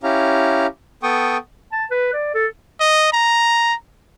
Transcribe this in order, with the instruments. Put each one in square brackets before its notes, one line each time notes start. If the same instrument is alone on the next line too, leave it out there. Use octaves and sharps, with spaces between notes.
[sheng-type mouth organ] C#4 E4 G4 F5 A#5
B3 A4 G5 C#6 D#6
[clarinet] A5
B4
D5
A4
[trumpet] D#5
A#5